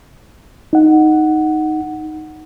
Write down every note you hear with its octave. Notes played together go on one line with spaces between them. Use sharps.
D#4 F#5